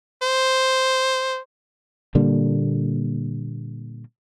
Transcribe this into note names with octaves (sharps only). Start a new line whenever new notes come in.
C5
A#2 D3 G3 A#3